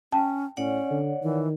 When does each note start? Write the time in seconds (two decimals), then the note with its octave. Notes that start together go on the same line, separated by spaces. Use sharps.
0.12 C#4 G5 A5
0.57 A2 C#4 C#5 D5 F#5
0.91 D3
1.23 D#3 E3